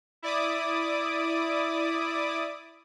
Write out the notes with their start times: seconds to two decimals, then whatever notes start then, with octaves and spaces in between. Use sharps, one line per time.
0.22 E4 D5 D6 D#6